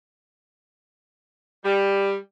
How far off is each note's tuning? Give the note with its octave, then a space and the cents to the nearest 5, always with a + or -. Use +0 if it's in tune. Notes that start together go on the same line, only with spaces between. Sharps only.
G3 +10